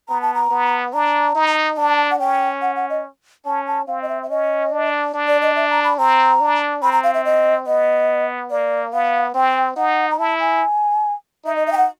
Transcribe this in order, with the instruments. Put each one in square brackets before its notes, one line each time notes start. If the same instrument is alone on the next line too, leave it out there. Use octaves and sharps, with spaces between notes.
[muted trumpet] B3 [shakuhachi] A#5
[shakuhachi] A5
A#5
[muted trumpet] B3
[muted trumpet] D4 [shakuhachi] A#5
[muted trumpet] D#4
[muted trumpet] D4 [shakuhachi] A5
[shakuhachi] F#5
[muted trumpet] C#4 [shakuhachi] G5
[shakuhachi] F#5
F#5
D#5
[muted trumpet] C#4 [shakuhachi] A5
[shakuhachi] A5
[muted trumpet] C4 [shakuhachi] F5
[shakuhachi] D#5
E5
E5
[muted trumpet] C#4 [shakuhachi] D#5
[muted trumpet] D4
D4
[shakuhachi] D5
D#5
E5
A#5
B5
[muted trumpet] C4 [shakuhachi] A#5
[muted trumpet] D4
[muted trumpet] C4 [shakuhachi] B5
[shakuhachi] A#5
F5
E5
D#5
[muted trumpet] B3 [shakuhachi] D#5
[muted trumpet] A#3 [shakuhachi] D5
[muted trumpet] B3 [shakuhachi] F5
[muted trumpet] C4 [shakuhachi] G5
[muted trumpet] D#4 [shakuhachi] F#5
[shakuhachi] A#5
[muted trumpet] E4 [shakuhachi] A5
[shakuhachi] G#5
[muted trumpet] D#4 [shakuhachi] E5
[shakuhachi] D#5
E5
G5
F#5